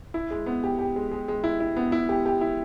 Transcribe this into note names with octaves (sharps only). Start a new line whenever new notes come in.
E4
G#3
B3
G4
G4
G#3
G#3
G#3
E4
E4
B3
E4
G4
G4
E4